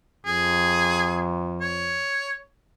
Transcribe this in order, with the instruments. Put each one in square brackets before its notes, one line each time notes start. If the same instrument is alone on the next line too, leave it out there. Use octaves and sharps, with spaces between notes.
[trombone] F2 [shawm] G#4
[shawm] C#5